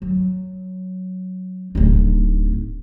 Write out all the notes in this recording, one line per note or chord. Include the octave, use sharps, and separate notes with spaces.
F#3
D1 D#4